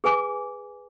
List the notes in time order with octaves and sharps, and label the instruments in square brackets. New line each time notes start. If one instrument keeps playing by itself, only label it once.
[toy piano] G#4 B4 G#5 D6